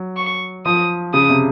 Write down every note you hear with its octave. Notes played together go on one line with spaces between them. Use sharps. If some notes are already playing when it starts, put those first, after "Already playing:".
Already playing: F#3
C#6
F3 D#6
C#3 D#6
C3